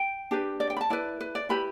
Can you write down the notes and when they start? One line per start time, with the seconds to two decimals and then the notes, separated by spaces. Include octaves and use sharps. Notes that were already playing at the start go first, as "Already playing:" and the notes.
Already playing: G5
0.31 D4 G4 B4
0.60 D5
0.70 G5
0.77 B5
0.81 A5
0.90 E4 B4 D5
1.21 B4
1.35 D5
1.49 E4 G4 B4 B5